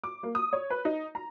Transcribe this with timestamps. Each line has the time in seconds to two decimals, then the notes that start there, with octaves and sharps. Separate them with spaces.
0.04 D6
0.23 A#3
0.35 D#6
0.53 C#5
0.70 B4
0.85 D#4
1.15 A#5